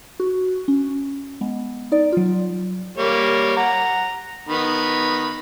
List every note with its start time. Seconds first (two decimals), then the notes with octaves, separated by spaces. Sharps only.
0.20 F#4
0.68 C#4
1.41 G#3 B3
1.92 D#4 D5
2.12 F#3 F4
2.98 G3 A#3 C#5
3.57 F#5 A#5
4.49 D#3 B3 B5